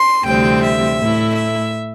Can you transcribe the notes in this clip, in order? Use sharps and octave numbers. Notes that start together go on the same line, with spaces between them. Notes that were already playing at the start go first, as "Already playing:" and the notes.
Already playing: C6
D2 C3 E3 G3 C4 G5
E5
A2 A3 E4
E5